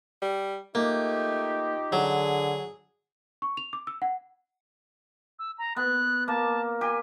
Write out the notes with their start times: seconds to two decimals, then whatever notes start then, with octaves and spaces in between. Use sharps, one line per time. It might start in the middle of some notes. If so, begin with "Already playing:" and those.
0.22 G3
0.75 A3 A#3 D#4 F4 G4
1.92 D3 F#3 G#4
3.42 C#6
3.57 F7
3.73 D6
3.87 E6
4.02 F#5
5.39 E6
5.58 A#5
5.76 B3 F#6
6.28 A#3 A5
6.81 G4 G#5